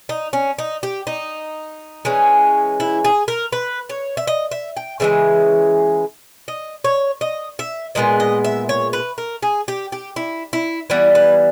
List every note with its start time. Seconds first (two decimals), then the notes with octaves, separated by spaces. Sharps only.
0.09 D#4
0.33 C#4
0.59 D#4
0.83 G4
1.07 D#4
2.05 E3 G#3 C#4
2.80 E4
3.05 G#4
3.28 A#4
3.52 B4
3.89 C#5
4.17 E5
4.27 D#5
4.51 E5
4.77 G5
5.00 C#3 E3 G#3 E5
6.48 D#5
6.84 C#5
7.21 D#5
7.59 E5
7.95 A#2 G#3 B3 D#5
8.20 D#5
8.44 E5
8.69 C#5
8.93 B4
9.18 A#4
9.42 G#4
9.68 G4
9.92 G4
10.16 E4
10.53 E4
10.90 E3 G3 B3 E4
11.15 B4